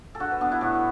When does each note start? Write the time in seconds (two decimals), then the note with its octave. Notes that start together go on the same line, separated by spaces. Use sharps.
0.15 A4
0.20 D3 F#4
0.31 B4
0.41 B3 D4
0.52 E4
0.61 A2 F#4